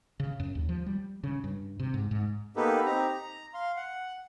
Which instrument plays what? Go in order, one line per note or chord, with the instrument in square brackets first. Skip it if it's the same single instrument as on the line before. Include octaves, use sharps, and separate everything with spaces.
[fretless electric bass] C#3
F#2
D#2
F3
G3
C#3
G2
C3
G#2
G#2
[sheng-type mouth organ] A#3 B3 D#4 G4 A4 B4
C4 D#4 G4 A#5
A#5
F5 C6
F#5